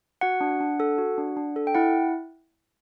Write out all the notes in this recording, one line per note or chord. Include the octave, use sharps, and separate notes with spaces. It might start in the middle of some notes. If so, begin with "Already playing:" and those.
F#4 F#5
D4
D4
A4
F#4
D4
D4
A4
G5
E4 F#5